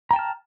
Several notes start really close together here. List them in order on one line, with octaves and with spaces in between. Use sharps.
A#5 G5 A5 F6